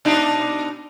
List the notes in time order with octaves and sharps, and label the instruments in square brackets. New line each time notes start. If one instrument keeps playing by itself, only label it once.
[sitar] B2 D4 D#4